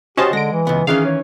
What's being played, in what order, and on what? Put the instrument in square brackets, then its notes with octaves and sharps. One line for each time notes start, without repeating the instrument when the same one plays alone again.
[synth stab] C#4 D#5 A5 [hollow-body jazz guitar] F#4 C5 [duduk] G4
[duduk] D3 [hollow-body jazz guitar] G#3 [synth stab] A#6 D7
[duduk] E3
[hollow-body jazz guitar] C#2 B3
[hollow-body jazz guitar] D#3 E3 C#4 [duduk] G#4 [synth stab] F5
[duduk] C#5